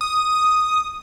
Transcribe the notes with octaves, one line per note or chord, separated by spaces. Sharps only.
D#6